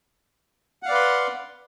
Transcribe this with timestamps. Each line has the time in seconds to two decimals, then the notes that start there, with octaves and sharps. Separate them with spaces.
0.83 F#5
0.86 F5
0.89 D5
0.91 B4
0.94 C6